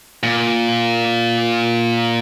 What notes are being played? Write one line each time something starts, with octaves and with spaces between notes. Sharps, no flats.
A#2